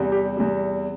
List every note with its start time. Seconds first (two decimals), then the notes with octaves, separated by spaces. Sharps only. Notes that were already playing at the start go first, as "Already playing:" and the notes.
Already playing: E2 C3 G3
0.12 G4
0.37 E2 C3 G3